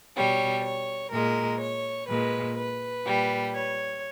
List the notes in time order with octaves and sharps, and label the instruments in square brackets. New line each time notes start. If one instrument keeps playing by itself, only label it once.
[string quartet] B2 G3 C#5
C#5
A#2 G#3 A#4
C#5
A#2 G#3 B4
B4
A#2 G3
C#5